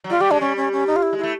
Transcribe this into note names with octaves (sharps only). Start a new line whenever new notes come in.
F#3
G3 F4
G3 G4
G#3 D4
G3 C#4
C#4
C#4
D#4
F4
E4
G#3
E4
A3